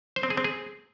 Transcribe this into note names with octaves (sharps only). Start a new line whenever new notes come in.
C5
C4
G#4
C4
G#4